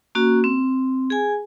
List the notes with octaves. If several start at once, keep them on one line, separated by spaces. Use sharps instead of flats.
A#3 C#4 F#4
C4
G#4 G#5